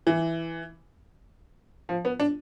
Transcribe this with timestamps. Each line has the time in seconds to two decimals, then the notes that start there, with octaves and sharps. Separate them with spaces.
0.07 E3
1.89 F3
2.05 B3
2.20 D4